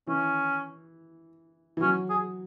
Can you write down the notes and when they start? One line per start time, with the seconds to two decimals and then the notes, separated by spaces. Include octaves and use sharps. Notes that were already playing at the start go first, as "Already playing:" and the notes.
0.07 E3 C#4
1.77 E3
1.81 F#3 C#4
2.10 G#4